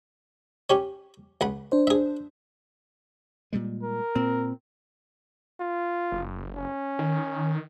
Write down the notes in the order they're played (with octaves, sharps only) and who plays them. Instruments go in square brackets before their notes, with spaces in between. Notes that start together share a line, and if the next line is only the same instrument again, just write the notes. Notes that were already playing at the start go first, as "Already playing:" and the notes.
[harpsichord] C#4 G4 C#5
C#2 F#5 B5
[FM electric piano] D4 C5
[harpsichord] G#4 E5
[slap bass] A#2 G3 G#3
[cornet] A#4
[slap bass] A#2 [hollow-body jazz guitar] C4
[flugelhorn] F4
[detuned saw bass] F#1
[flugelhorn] C#4
[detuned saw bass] D#3